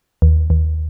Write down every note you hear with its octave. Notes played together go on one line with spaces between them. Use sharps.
D#2
D#2